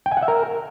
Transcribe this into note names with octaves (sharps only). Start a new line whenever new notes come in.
G5
G#5
F#5
E5
A#4